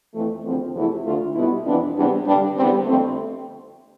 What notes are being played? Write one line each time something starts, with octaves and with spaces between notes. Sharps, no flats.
F2 E3 A3
E2 D3 F3 C4
E2 C3 F3 A3 E4
D2 D3 A3 F4
B2 G3 B3 E4
F2 E3 B3 D4
E2 C3 G3 B3 D4
G2 D3 G3 D4
E2 D3 G3 B3 C4
F2 D3 A3 C4